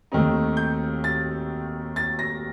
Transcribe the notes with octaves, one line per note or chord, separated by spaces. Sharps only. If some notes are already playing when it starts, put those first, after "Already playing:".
D#2 D#3 A3 C4 D#4
G6
A6
A6
A#6